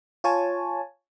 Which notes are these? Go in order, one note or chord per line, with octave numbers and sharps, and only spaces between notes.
F4 C#5 G#5 A5